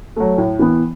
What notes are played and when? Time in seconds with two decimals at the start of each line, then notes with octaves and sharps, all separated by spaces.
0.16 F#3 A3
0.38 A2
0.59 E3 B3